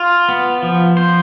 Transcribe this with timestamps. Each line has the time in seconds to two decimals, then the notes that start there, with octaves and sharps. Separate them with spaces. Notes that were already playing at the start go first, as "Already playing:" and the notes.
Already playing: F4
0.29 B3
0.63 F3
0.97 C5